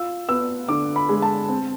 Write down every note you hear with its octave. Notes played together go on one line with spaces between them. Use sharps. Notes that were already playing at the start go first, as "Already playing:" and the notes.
Already playing: F4 E6
B3 E6
D3 D6
B5
G#3
A5
C4